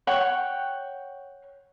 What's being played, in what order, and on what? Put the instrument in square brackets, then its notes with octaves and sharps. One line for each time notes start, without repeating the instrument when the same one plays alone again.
[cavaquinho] C#5 F#5 G5 C#6